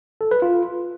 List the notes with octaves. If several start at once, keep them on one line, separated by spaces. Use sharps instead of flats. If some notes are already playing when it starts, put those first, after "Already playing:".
A4
B4
F4